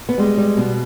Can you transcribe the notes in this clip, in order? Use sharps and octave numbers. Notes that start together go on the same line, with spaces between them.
B3
G3 G#3
G3
B2